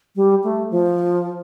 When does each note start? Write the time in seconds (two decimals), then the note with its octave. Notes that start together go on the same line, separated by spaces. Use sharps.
0.16 G3
0.44 A3
0.71 F3